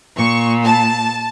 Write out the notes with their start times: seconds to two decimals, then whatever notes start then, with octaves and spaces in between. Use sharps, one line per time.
0.17 A#2 C#6
0.63 A5